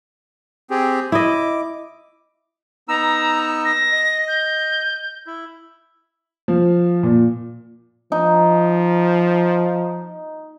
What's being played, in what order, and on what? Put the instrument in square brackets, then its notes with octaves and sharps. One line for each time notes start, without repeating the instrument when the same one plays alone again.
[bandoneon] C4 G4 G#4
[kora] E4 D#5 [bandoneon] D6
[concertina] B3 D#4 E6 [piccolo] A#5
[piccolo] A#6
[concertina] D#5
[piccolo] G6
[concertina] E4
[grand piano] F3
A#2
[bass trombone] F3 [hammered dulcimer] D#4